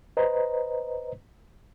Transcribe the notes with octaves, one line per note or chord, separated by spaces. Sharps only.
B4 C5 D#5 A#5